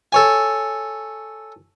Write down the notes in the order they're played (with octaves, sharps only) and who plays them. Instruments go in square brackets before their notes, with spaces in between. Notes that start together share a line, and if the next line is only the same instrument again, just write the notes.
[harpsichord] A4 C#5 G#5